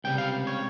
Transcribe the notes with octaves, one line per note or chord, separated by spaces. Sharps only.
C#2 C3 G3 G5
F5
C#5